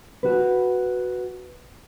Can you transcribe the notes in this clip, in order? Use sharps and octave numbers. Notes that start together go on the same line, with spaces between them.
F#4 B4